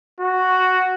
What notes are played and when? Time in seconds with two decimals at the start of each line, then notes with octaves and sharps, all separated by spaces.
0.21 F#4